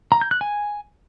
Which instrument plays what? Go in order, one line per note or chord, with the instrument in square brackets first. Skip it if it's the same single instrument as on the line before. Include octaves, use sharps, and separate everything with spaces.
[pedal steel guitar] A#5
G6
F#6
G#5